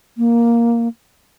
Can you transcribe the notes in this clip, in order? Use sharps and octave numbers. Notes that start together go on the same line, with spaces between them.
A#3